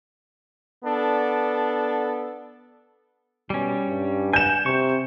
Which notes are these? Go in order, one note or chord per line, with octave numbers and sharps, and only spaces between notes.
B3 D4 A4
B2 G3 C#4
G2
F#5 G#5 G6 E7
C3 C#6